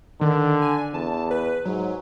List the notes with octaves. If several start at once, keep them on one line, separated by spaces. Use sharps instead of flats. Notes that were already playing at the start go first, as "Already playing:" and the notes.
D3 D#3
G#5
E2 A5
B4
G#2 F#3